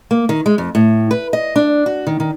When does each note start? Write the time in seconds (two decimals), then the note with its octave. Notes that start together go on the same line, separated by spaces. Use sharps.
0.11 A#3
0.29 D#3
0.46 G#3
0.58 F2
0.75 A2
1.11 B4
1.33 D#5
1.56 D4
1.86 F#4
2.07 D#3
2.20 D#3